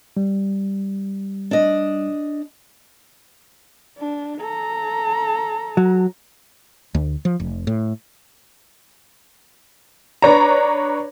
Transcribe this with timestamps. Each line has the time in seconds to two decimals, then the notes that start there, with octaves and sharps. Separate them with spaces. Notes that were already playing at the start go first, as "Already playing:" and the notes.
0.17 G3
1.51 D4 D#5
3.98 D4
4.41 A4 A#5
5.77 F#3
6.95 D2
7.25 F3
7.40 F1
7.67 A2
10.22 D4 B4 C#5 A#5